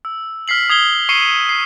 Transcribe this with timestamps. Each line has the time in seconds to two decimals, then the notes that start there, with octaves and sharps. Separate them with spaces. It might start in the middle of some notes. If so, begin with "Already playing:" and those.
0.05 E6
0.48 F6 B6 C7 F#7
0.70 D#6 G#6 C7 G7
1.09 C#6 C7 C#7 D#7 E7 G7
1.49 C7 G7